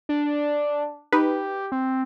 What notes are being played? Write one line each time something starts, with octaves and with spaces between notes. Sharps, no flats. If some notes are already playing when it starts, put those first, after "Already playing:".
D4
D#4 G4 B4
C4